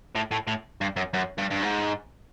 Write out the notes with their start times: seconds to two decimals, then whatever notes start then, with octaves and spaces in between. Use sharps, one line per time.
0.16 A2
0.32 A2
0.47 A2
0.81 G2
0.96 F#2
1.14 F#2
1.38 G2
1.50 G2
1.62 G#2